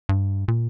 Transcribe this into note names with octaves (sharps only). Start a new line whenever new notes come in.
G2
A#2